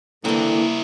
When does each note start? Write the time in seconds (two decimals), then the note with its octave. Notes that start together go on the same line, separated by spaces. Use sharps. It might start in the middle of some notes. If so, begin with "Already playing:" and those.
0.25 D3 E3 A#3 C4 E4 A#4